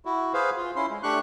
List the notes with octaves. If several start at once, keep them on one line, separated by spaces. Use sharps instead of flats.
E4 F#4
G#4 B4 C5 F5
F4
C#4 E4 C6
G#3
A3 D4 G4 C#6 F#6